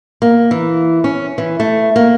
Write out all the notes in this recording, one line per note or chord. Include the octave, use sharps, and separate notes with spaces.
A#3
E3
C#4
E3
A3
A#3